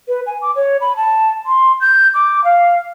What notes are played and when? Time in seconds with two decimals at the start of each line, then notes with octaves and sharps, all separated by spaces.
0.08 B4
0.27 G#5
0.42 D6
0.56 C#5
0.81 B5
0.97 A5
1.46 C6
1.81 G6
2.14 D6
2.44 F5